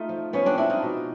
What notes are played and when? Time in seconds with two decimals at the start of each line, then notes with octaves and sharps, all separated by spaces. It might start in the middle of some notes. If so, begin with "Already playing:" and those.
Already playing: A3 D#4 F4
0.09 F3
0.33 F3 B3 C#4
0.46 C4 D4
0.57 G#3 D4 E4
0.70 D#4 F4
0.82 B2